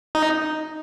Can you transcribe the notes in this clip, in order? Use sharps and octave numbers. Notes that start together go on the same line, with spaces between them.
D#4